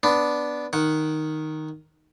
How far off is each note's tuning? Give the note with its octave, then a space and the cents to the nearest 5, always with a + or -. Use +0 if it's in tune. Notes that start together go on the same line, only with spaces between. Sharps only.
B3 +0 D4 +0
D#3 +0 F#5 +0